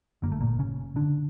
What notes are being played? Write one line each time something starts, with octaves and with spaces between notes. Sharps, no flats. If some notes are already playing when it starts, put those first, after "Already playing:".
G1 F#2 D3 A#3
A3
A#2 A#3
C#3 C#4
D3 D4